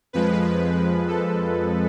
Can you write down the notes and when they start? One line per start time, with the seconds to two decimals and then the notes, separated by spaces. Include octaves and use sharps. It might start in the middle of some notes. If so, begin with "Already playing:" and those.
0.13 F2 F3 G#3 B4
1.08 A4